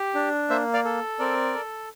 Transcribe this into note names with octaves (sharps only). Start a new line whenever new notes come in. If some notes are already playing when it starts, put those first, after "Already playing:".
Already playing: G4
D4
A#3 C5 E5
D5 F5
A4
C4 A#4 D5
A4